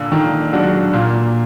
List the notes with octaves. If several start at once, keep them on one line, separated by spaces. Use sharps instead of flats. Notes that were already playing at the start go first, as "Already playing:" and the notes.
Already playing: A#2 D3
D3 D#3
F#3 G#3 D4 F#4
A#2 A#3